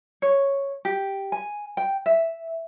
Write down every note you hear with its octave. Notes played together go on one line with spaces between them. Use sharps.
C#5
G4
G#5
G5
E5